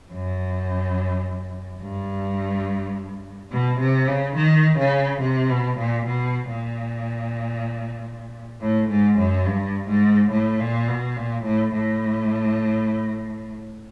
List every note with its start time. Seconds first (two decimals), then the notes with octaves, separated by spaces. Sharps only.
0.12 F#2
1.81 G2
3.52 B2
3.80 C3
4.08 C#3
4.36 D#3
4.79 C#3
5.21 C3
5.50 B2
5.79 A#2
6.06 B2
6.49 A#2
8.61 A2
8.89 G#2
9.18 F#2
9.46 G2
9.89 G#2
10.31 A2
10.60 A#2
10.88 B2
11.16 A#2
11.44 A2
11.73 A2